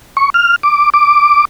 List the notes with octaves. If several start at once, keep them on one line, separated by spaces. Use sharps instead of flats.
C#6
F6
D6
D6